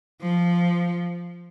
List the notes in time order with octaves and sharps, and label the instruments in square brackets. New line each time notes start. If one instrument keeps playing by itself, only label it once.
[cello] F3